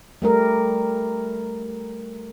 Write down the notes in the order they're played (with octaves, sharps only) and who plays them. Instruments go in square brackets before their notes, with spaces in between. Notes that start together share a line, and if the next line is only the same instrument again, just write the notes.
[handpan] G3 A3 A#4